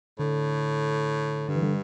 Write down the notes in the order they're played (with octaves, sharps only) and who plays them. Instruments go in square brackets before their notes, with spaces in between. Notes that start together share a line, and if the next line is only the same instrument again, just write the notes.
[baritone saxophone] A2 [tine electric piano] D3
[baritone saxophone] G2 [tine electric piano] D3
[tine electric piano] E3
D3 G3